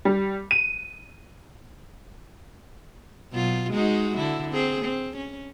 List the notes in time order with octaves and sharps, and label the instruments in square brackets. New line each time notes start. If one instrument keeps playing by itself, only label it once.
[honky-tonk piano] G3
D#7
[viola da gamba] B2 F#3 F4
G#3 D#4 F#4
D3 E4
C4 G#4
C4
C#4